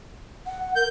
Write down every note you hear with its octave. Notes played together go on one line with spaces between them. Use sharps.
F#5
A#4 G6